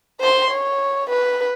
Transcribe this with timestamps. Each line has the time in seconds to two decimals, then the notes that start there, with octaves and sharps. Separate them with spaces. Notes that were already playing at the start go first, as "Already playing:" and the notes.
0.21 C5 C6
0.51 C#5
1.10 B4